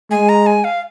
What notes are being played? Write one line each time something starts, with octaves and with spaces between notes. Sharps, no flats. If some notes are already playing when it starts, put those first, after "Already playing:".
G#3 G#5
A#5
G#5
F5